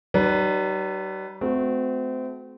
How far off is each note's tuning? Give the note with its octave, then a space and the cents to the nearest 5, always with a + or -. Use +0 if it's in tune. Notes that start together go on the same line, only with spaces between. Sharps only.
G3 -45 D#4 -35 B4 +0
A3 -30 C4 -30 F#4 -15